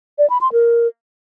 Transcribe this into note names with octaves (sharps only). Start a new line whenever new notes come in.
D5
B5
C6
A#4